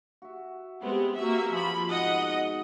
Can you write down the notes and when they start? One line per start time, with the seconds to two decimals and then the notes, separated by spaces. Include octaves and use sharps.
0.22 F#4 E5
0.82 C3 G#3 B3 C4 G4
1.15 A#3 F#4 E5
1.53 F3 G#4 B5
1.89 G#2 B2 D#3 D#5 F#5